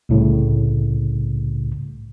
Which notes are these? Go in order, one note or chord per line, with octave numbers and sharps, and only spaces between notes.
C2 A2 C#3